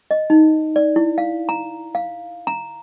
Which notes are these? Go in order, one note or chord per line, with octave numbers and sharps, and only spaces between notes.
D#5
D#4
D5
E4
F5
A#5
F5
A#5